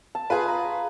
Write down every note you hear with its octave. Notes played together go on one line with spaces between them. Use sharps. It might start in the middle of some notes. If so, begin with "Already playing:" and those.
A5
F4 G#4 B4 B5
A#5